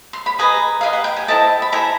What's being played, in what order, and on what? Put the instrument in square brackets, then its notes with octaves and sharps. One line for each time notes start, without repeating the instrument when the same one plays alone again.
[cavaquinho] C6
B5
G#4 B4 D#5 G#5 A#5
G#4 B4 D#5 F5
F#5
G5
G#5
E4 A4 C5 D#5 G5 A5
B5
E4 A4 C5 G#5 A#5